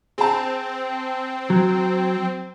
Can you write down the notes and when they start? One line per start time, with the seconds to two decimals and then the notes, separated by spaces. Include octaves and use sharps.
0.18 C4 G#4 A5
1.50 F#3